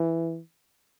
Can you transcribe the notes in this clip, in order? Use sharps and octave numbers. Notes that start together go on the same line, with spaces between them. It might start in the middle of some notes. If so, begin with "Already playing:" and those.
Already playing: E3